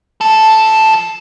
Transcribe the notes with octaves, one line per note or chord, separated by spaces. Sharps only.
F3 A4